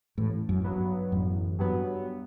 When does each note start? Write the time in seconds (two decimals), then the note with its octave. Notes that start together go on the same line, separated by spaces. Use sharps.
0.18 A1 A2
0.49 F#2
0.64 G2 F#3 B3
1.12 A1 F#2
1.59 G2 F#3 B3